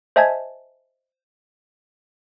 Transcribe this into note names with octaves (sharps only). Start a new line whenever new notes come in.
C5 D#5 E5 G#5 A5 G#6